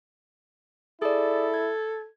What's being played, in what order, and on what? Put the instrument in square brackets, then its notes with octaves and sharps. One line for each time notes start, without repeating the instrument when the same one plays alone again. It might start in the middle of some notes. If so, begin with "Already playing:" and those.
[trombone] E4 [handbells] G#4 D5 [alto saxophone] A4
[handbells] G#6